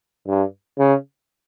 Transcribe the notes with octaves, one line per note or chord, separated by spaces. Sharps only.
G2
C#3